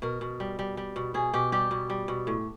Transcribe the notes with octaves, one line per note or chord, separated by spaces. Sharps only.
B2 A#4
B2
G3
G3
G3
B2
B2 G#4
B2 G4
G3 G4
B2
G3
B2
A2